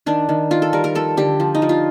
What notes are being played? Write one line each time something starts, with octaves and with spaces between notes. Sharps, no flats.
D#3 D4
D#3
D#3 F4
A4
G3 A#4
A#4
F3 A4
D3 G4
F3
D#4
F3
F4